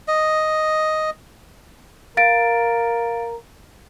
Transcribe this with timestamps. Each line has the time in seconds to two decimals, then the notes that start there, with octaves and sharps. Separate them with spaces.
0.08 D#5
2.17 A#4 F5 A6 D7